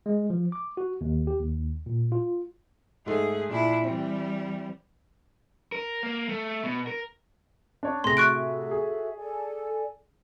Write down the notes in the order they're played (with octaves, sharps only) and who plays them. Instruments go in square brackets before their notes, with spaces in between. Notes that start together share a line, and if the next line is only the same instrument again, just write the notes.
[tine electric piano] G#3
F3
D6
F#4
D#2
G4
D#2
A#2
F4
[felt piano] G#2 A3 [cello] G#4
[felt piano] A#2 [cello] D4 E4
[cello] E3 G3 [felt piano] C4
[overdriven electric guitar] A#4
A#3
A3
B2
A#4
[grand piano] D4 C#5
[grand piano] A2 C3 G#4 [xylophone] C6 A#6
[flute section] F#4 A4 E5 [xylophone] C#6 F#6 D7
[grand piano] G#4
[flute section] A4 D5 G#5